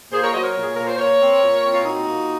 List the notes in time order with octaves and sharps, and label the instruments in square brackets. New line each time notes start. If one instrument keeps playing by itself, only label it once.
[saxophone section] A#2 G#4 C5
A#4 C#5
F#3 C5 D#5
A#4 C#5
A#2
G#4
A#2 A#4
C5
A#2 A#4 C#5
C4
A#2
C4
F4
A#2 D#4 F#4
A#2